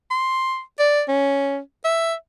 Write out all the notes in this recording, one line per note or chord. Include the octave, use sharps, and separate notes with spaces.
C6
D5
C#4
E5